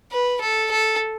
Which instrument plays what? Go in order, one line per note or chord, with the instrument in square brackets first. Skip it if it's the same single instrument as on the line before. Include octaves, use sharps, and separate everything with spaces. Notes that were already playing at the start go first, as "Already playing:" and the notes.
[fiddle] B4
A4
A4